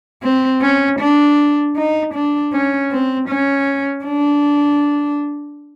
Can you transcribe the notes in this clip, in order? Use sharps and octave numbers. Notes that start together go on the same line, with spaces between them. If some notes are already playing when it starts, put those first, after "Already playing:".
C4
C#4
D4
D#4
D4
C#4
C4
C#4
D4